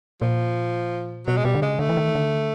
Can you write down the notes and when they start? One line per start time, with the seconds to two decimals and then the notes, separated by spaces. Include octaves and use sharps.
0.22 A#2 F3
1.27 B2 F#3
1.37 G#3
1.45 B2 G3
1.55 D3
1.62 C#3 G#3
1.79 D3 A3
1.89 E3
1.97 D#3
2.15 D3